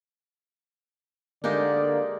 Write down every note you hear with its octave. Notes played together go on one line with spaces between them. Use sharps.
D3 G#3 A#3 D#4 G4 D5